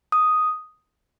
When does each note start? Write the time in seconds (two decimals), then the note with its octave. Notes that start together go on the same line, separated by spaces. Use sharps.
0.12 D#6